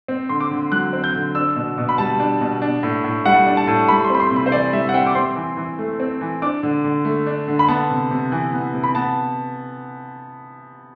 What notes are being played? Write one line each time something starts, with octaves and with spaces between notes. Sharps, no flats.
C4
D3 C6
D6
D3
F#3 F#6
C4
G6
D3
D4 E6
B2
B2
B5
G3 A5
D4
B2
D4
A2
A2
G3 F#5
D4
A5
A2
G3 B5
C6
C4 B5
C6
C3
B5
C5
E3 D5
G3 E5
F#5
C4 G5
D6
C4 C6
E3
E3
A3
C4
E3
D4 D6
D3
D3
A3
D4
D3
B5
B3 A5
C3
C3
E3
B3
C3
B5
B3 A5